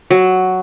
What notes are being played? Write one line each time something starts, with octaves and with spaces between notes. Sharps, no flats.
F#3